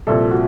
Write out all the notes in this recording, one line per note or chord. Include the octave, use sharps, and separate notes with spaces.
C2 A#2 F3 A4
F#4